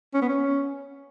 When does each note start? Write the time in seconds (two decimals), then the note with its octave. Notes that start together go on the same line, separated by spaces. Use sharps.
0.14 C#4
0.22 B3
0.29 C#4